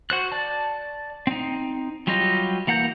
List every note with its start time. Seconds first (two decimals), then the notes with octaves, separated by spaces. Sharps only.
0.10 F#4 C5 F#6
0.32 D5 A5
1.27 C4 D#4
2.07 F#3 G3 F4 G4 D#5
2.67 E3 A#3 F#5 A#5 G6